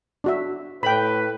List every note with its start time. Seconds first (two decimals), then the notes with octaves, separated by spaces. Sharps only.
0.24 D4 F#4 E5
0.83 A2 B4 G5 B5